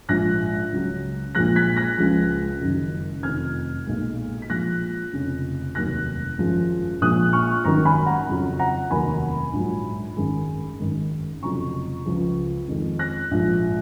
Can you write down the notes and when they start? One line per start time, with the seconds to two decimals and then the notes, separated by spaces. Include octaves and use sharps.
0.09 A#1 G#2 F3 G#3 F#6 A#6
0.72 C#2 C#3 F#3
1.35 A#1 A#2 F3 G#3 F#6 A#6
1.56 G#6 B6
1.77 F#6 A#6
1.98 C#2 C#3 F3 G#3
2.61 F#1 F#2 D#3 F#3
3.23 F1 F2 D#3 F6 G#6
3.87 B1 A#2 G#3
4.42 B6
4.49 A#1 A#2 F3 G#3 F#6 A#6
5.13 F1 F2 C#3
5.75 F1 D#2 D#3 F#3 F#6 A#6
6.38 G#1 F#2 F3 G#3
7.01 A#1 A#2 F3 G#3 D#6 F#6
7.33 C#6 F6
7.64 G#1 F#2 D#3 F#3 A#5 C#6
7.85 G#5 B5
8.06 F#5 A#5
8.28 F2 C#3 F#3
8.59 F#5 A#5
8.90 F1 D#2 D#3 F#3 G#5 B5
9.53 A#1 G#2 F#3
10.17 G#1 F#2 D#3 G#3
10.80 G#1 F#2 D#3 G#3
11.42 F1 F2 C#3 F#3 A#5 C#6
12.05 C#2 C#3 F3 G#3
12.68 F2 D#3 G#3
12.99 F#6 A#6
13.31 A#1 G#2 F3